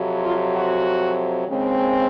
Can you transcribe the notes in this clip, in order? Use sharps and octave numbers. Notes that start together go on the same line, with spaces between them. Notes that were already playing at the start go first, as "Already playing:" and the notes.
Already playing: F2 C3 F#3
F4
F#4
D#2 C#3 G#3 C4